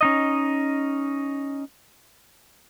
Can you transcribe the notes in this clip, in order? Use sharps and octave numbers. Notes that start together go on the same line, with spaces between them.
C#4 D#4 D#5